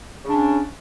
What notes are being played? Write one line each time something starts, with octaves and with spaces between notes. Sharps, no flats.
C#3 C#4 D4